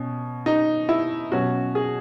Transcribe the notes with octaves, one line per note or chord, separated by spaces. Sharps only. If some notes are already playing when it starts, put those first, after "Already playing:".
Already playing: B2 C#4
D#4
E4
B2 F#3 C#4 F#4
G#4